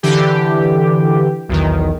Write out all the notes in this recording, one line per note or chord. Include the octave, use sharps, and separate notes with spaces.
D3 E3 G4
B1 E2 D#3